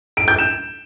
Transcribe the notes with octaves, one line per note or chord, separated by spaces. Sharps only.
D7
G6
E7